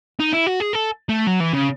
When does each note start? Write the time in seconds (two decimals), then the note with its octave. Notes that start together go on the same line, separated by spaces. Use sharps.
0.20 D#4
0.33 E4
0.47 F#4
0.60 G#4
0.73 A4
1.09 A3
1.27 F#3
1.40 E3
1.53 C#3